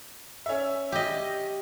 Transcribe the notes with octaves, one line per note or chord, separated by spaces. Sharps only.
C#4 E5
G4 D#5